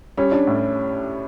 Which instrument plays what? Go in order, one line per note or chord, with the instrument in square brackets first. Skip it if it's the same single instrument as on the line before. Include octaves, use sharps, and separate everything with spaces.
[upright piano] G3 [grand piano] C#4
[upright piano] D4
A2